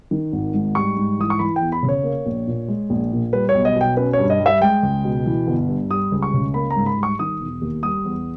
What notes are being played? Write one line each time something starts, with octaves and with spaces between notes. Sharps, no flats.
D#3
G#1
G#2
G3 C#6
G#2
E3 D#6
C#6
E3 B5
G5
E2
B5
C#3
C#5
A#3
A#1
A#2
G#3
A#1
A#2
G3 B4
C#5
B1
D#5
B2
G5
C#4 B4
C#5
G2
D#5
G3
E5
G#3 G5
C#2
B2
E3
G1
G2
G3 D#6
C#2
C#6
C#3
A#3 B5
A#5
G#2
B5
G3
C#6
D#3 D#6
E1
D#2
G3 D#6
E2